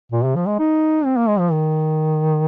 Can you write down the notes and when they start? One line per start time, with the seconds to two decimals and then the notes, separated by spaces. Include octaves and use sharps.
0.12 A#2
0.25 C3
0.36 F3
0.47 G#3
0.59 D#4
1.05 C4
1.17 A#3
1.28 G#3
1.40 F3
1.51 D#3